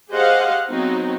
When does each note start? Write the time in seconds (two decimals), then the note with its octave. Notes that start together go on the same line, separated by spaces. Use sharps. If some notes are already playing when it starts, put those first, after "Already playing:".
0.12 G4 G#4 C5 D#5 F5 F#5
0.69 F#3 B3 C4 D#4